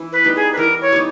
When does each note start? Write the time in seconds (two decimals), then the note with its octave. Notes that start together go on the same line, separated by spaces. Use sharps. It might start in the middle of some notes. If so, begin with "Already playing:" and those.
Already playing: E3
0.12 B4
0.24 G3 B3 D#4
0.35 G#4
0.53 B4
0.57 E3 A#4
0.81 C#5
0.93 G3 B3 D#4